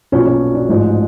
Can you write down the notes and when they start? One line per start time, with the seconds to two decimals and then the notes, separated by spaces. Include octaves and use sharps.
0.12 B1 A#2 F#3 C#4
0.26 C#4
0.55 D4
0.69 A1 G#2 F3